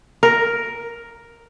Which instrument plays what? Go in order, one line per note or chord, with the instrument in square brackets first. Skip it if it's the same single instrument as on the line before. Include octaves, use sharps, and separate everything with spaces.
[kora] A#4